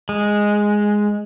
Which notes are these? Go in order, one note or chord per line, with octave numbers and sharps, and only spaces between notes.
G#3